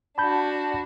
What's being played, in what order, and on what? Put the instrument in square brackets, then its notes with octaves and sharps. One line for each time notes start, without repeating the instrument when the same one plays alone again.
[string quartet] D4 F#4 [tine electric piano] A5 B5 G6